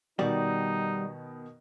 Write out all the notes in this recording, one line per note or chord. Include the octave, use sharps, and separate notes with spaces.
B2 D#3 G3 B3 D#4 F#4 D5